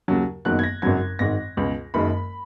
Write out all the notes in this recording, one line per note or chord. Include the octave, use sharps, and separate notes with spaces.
D#2 C#3 F#3
F#1 E2 D#3 F#3 F#6
G#6
A#6
G#1 F#2 C#3 F#3 G#6
G#1 G#2 D#3 A#6
C#2 B2 G#3
F#1 F#2 D#3 G#3 B5